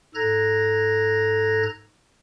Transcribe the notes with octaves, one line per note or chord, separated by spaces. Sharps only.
G#2 A4 A#5 F#6 G#6 A#6